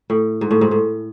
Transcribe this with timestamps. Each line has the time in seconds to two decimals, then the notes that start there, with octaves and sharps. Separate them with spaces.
0.10 A2
0.41 G#2
0.51 A2
0.61 G#2
0.71 A2